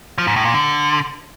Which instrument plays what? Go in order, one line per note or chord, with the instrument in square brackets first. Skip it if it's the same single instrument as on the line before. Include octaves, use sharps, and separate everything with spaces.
[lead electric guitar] F3
G#2
A2
A#2
D3